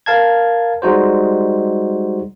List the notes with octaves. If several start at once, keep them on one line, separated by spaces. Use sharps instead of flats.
A#4 F5 A5 G#6
G3 G#3 D#4 F#4 C5